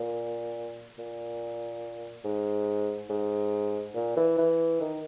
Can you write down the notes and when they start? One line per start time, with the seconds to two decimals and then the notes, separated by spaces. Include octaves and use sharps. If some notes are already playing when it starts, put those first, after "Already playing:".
Already playing: A#2
0.98 A#2
2.24 G#2
3.10 G#2
3.95 A#2
4.16 E3
4.38 E3
4.81 D#3